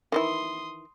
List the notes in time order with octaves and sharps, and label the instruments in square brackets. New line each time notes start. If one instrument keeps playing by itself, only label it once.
[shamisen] D#3 E3 E4 [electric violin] C6 D#6